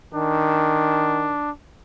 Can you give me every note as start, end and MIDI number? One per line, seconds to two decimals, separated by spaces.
0.14 1.35 51
0.14 1.51 62